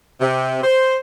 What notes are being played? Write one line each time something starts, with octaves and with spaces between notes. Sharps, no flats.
C3
C5